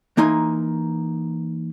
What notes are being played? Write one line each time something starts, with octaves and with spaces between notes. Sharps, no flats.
E3 A#3 D#4 G#5 C6